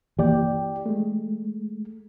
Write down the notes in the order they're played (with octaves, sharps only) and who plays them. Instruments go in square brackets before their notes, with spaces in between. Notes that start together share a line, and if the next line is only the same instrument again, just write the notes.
[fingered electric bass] E3 A#3 [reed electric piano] G4 D5 G5
[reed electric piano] G#3 A3